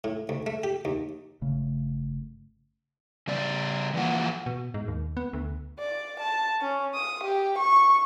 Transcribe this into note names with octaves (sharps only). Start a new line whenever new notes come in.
A2
D2
A3
G4
D#2
G1 C#3 A3
C#3 G3 D5
E3 F3 A#3 F#5
B2
G#2
D#2
B3
D2
D5
A5
C#4
D#6
G4
C#6